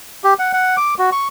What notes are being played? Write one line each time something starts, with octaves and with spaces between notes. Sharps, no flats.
G4
F#5
F#5
D6
F#4
C#6